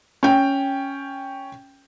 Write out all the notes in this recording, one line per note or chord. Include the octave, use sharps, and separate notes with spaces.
C#4 G5